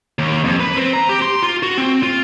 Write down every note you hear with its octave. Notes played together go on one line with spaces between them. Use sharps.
D#2
F2
B4
C4
A#5
G4
C6
F4
F#4
C4
F4